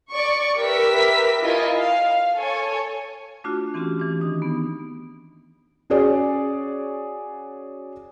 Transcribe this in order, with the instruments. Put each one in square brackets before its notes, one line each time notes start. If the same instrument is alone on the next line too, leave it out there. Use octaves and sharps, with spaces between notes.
[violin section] D5 C#6
G4 A#4 B4 E5 B6
E4 F4 A#4 D#5 G#5
F5
A4 C#5 G#5
[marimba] A3 D4 F4 F#4
E3 C4 C#4 F#4 G4
E3 D4
D#3 D#4
B3
[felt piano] C#4 F#4 G#4 C#5 D5